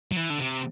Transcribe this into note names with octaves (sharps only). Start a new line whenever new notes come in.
F#3
E3
D3
C3